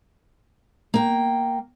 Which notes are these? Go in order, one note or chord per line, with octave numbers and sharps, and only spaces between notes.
A#3 G5